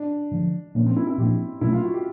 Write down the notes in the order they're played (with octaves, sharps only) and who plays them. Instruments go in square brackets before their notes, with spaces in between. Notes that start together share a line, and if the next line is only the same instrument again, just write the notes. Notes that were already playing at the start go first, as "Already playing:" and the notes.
Already playing: [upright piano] D4
[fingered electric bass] D3 F3 G#3
[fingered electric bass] A#2 F3 A#3 D4 [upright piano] C#4
[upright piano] C4
E4
E4
[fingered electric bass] A#2 F3 A#3 D4 [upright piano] G4
[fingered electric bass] B2 F#3 A3 [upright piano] E4
[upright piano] F4
F#4
G4